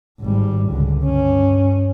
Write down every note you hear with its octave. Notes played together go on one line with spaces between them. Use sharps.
G#1 G3
C#2 D3
G2 C#4